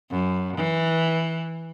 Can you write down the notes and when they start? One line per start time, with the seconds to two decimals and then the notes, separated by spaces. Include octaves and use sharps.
0.11 F#2
0.56 E3